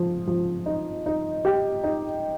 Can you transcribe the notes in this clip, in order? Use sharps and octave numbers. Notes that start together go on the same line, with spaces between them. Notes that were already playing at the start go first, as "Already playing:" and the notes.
Already playing: F3
F3
D#4
D#4
G4
D#4